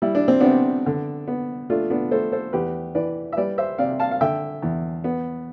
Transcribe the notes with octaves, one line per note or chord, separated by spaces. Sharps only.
G3 E4
D4
C4
C3 B3 D4
D3
B3
A3 D4 F4
B3 D4
A3 A4 C5
A4 C5
E2 G4 B4
E3 B4 D5
E5
G3 B4 D5
C5 E5
C3 D5 F5
F5 A5
F5
D3 E5 G5
E2
B3